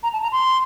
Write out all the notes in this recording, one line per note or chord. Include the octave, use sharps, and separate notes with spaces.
A#5
A5
A#5
C6